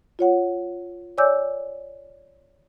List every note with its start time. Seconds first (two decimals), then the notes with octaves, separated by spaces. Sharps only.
0.19 F4 C#5 F#5
1.18 C#5 D5 G#5 D6 E6 G6